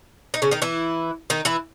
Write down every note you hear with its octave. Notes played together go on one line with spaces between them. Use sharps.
D#4
C#3 C#4
D#3 D#4
E3 E4
D#3 D#4
E3 E4